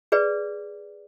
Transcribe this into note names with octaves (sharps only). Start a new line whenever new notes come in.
G#4 B4 D5